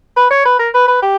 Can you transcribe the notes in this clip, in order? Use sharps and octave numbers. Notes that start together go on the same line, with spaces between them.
B4
C#5
B4
A#4
B4
B4
G4